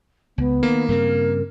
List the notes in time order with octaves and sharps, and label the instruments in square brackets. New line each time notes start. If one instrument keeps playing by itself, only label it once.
[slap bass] C#2 [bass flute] B3
[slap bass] D#3 [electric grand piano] A#3
[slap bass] G2 C#3 C4 [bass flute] A#4